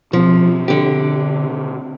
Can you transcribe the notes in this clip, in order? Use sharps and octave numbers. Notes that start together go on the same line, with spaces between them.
B2 F3 C4
D3 G4